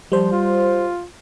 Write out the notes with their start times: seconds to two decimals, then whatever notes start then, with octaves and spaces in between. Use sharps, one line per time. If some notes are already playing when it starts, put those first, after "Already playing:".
0.12 F3 G3 C5
0.32 F4